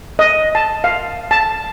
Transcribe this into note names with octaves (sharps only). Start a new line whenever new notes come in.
D#5
A5
F5
A5